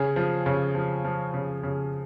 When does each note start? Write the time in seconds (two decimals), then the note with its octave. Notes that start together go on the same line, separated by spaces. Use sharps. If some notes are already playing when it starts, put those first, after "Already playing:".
Already playing: C#3 G#4
0.16 F3
0.46 C#3
0.75 F3
1.05 F3
1.34 C#3
1.63 C#3